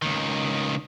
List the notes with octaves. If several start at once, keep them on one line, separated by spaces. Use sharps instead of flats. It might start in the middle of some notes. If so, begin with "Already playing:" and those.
C#2 D#3